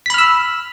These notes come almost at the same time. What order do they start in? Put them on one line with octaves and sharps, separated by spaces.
B6 B5 F6 E6